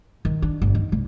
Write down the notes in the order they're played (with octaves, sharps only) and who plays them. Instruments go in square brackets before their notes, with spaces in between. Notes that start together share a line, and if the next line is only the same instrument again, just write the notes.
[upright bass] D#3
D4
G1
D#3
C2